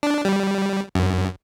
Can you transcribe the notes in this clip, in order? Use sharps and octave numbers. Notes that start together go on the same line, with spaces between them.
D4
G3
F#2